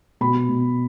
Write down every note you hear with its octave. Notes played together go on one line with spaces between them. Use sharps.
B2 B5
B2